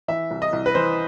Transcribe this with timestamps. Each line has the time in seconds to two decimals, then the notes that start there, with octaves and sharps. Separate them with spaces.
0.08 E3 E5
0.31 C2
0.42 D#5
0.53 C2
0.66 B4
0.75 E3 C5